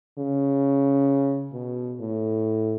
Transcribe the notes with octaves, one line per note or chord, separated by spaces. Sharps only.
C#3
B2
A2